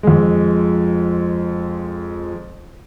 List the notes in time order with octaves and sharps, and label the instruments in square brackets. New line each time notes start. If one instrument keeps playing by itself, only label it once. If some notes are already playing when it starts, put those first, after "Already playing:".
[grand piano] F2 G#3